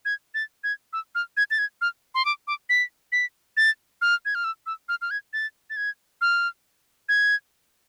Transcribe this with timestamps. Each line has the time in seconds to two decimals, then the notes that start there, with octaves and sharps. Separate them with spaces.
0.05 G#6
0.34 A6
0.64 G#6
0.93 E6
1.15 F6
1.37 G#6
1.51 A6
1.59 G#6
1.81 F6
2.15 C6
2.25 D6
2.47 D6
2.69 B6
3.12 B6
3.57 A6
4.02 F6
4.25 G#6
4.35 F6
4.44 E6
4.66 E6
4.89 F6
5.02 F6
5.11 G#6
5.33 A6
5.70 A6
5.76 G#6
6.21 F6
7.09 G#6